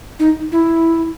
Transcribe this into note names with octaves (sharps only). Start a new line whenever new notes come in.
D#4
E4